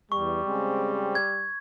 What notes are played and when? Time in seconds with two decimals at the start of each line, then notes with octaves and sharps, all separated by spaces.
0.12 E2 G3 C#6
0.44 C#3 G#3 C4
1.15 G#6